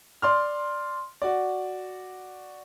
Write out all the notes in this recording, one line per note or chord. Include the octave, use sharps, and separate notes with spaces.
D5 C6 F6
F#4 D5